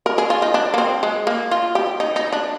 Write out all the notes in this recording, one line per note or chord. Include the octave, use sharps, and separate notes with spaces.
A#4
G#4
F4
D#4
D4
A#3
C4
G#3
A#3
F4
G4
D#4
D#4
D4